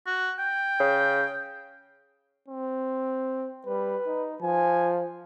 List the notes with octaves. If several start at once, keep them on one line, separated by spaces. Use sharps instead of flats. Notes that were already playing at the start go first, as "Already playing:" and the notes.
F#4
G5
C#3
C4
G3 B4
D#4
F3 G#5